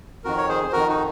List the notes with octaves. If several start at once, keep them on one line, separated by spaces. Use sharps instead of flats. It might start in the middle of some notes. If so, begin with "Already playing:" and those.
F2 D#3 F#4 A#4
C#5
G#4 C5
C5
F2 D#3 F#4 A#4
D#4 F#4